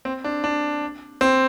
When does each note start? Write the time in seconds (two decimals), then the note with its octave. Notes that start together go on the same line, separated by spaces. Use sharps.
0.05 C4
0.24 D4
0.44 D4
1.21 C4